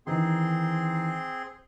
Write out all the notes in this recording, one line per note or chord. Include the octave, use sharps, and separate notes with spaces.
D#3 E3 C4 D#4 G#4 C6